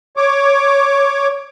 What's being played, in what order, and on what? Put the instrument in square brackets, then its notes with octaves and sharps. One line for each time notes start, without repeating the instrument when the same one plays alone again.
[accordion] C#5 D6